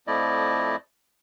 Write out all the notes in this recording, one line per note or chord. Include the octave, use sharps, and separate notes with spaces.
F2 F3 A3 E4 D5 D#5